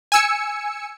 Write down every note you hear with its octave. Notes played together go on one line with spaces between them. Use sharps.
G#5 E6 C#7